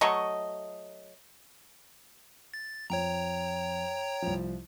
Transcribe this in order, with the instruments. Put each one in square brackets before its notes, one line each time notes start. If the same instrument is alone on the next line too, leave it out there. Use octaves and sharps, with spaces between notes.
[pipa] F#3 A3 D#5 C#6
[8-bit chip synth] A6
[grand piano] F2 [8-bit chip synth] C#5 G5 A#5
[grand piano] C2 F3